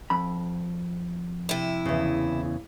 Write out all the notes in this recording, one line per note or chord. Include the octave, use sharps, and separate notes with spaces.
F2 B5
C3 E4
E2 C#3